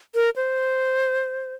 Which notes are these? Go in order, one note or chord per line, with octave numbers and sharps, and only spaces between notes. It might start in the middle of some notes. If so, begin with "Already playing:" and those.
A#4
C5